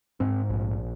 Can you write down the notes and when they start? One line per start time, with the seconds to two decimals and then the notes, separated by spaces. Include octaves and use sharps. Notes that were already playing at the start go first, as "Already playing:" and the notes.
0.20 G#2 C4
0.50 A#1